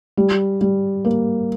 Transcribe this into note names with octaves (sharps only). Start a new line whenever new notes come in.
G3
G3
A#3